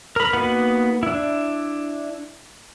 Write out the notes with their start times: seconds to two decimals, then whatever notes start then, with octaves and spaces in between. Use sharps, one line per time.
0.16 A#4 B5
0.33 A#3 B3 D#4 F#4 B4
1.03 D4 E4